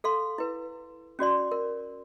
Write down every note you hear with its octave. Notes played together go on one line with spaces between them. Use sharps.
A4 F5 C6
E4 B4
C#4 F#4 D5 C6
A#4